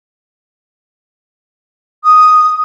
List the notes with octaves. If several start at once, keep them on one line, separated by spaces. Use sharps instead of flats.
D#6